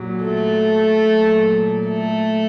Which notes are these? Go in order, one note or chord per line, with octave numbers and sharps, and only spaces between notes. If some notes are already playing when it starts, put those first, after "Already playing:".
Already playing: A#2 F#3
A3 A4
A#2 F#3
A3 A4